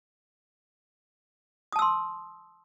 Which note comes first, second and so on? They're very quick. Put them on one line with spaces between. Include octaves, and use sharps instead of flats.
D#6 A5 E6 C6